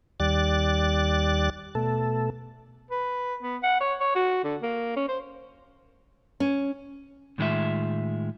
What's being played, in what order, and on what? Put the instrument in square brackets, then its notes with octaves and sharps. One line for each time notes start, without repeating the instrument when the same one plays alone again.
[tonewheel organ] D#2 G3 D5 F#6 A6
B2 A3 A4
[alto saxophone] B4
B3
F#5
C#5
C#5
F#4
D3
A#3
C#4
C5
[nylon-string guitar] C#4
[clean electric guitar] A2 D#3 G#3 C4 F4 E5